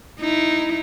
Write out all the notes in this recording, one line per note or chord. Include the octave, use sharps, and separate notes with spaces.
D#4 E4